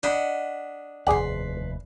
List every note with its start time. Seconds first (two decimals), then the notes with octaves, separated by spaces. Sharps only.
0.03 D4 D#5 F#5 B5
1.07 F1 D#2 G#4 B4 D5 F#5 C6